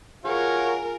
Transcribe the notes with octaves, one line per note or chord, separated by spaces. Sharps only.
F4 F#4 G#4 A#4 C#5 F5